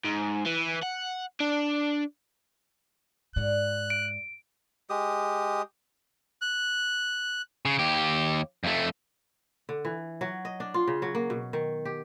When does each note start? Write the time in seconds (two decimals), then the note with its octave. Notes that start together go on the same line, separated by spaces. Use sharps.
0.04 G#2
0.46 E3
0.83 F#5
1.41 D4
3.36 G#2 D5 F#5 F#6
3.90 D7
4.90 G#3 G4 D#6
6.42 F#6
7.65 C#3
7.79 D#2 G4
8.64 F2 A3
9.69 D3
9.85 E3
10.21 F#3
10.45 D#5
10.60 D4
10.74 F4
10.87 C#3
11.02 F#3
11.15 A#3
11.30 B2
11.53 D#3
11.85 G4